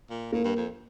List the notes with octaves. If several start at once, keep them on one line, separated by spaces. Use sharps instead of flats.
A#2
A2 A#3
G2
F2